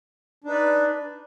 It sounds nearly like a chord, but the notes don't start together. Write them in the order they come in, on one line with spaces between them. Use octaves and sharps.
D4 D#4 B4 D5